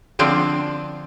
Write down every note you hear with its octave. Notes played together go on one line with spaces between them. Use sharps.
D3 F3 C4 D4